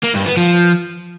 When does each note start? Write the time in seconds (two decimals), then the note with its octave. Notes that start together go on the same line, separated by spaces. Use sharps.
0.03 A#3
0.14 G2
0.25 B3
0.37 F3